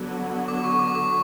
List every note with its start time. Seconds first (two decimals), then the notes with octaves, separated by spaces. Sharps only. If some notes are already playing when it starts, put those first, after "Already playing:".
Already playing: D3 F#3 B3
0.48 D6
0.64 C#6
0.79 D6
0.95 D6